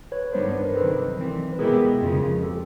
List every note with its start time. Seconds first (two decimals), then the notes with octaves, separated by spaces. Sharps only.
0.12 B4 C#5
0.32 G2 D#3 G3 B3 D4 A#4 C5
0.54 B4
0.65 A#4
0.75 C3 D#3 F#3 A4 B4
1.17 E3 G3 C4
1.53 B4
1.59 B2 G#3 B3 E4 G4 G#4 A#4
2.01 F2 C#3 F3 G#3
2.43 G4 A4